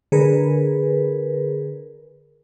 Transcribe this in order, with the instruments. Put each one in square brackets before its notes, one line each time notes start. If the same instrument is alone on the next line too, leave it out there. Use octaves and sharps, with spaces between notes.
[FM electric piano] D3 G#4 A#4 B4